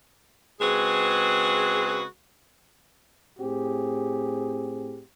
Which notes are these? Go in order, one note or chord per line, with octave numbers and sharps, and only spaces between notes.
C#3 G#3 C4 F#4 G#4 B4
A2 C4 G4 G#4